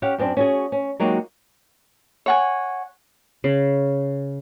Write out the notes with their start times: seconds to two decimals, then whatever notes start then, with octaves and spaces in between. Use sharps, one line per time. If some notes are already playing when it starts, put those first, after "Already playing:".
0.02 C#4 G4 F5 F#5
0.18 F#2 B3 C4 D4
0.37 C#4 F#4 G#4
0.72 C#4
1.00 F#3 G#3 A#3 D#4 F#4 G4
2.26 C#5 F#5 G#5
3.44 C#3